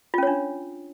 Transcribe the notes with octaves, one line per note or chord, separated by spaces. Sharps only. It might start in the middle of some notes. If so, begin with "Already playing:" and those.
C#4 D4 F4 C#5